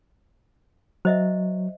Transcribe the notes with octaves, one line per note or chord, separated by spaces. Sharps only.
F#3 C5 D#5 E5